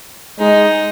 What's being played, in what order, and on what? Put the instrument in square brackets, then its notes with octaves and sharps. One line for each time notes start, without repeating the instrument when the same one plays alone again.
[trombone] G#3 [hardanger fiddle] D#4